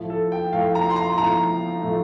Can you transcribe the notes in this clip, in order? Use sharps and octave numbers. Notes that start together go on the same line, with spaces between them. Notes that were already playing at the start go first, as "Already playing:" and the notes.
Already playing: A2 F3 A3
A4
G5
A2 F3 A3 F5
A#5
C6
A#5
A2 F3 A3 A#5
A2 F3 A3